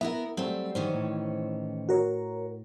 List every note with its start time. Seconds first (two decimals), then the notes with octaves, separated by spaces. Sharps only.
0.01 B3 E4 F#4 A#4 E5
0.37 F#3 G3 A3 C4
0.75 D#3 E3 C#4 C5
0.94 A2
1.89 F#4 A#4 C#5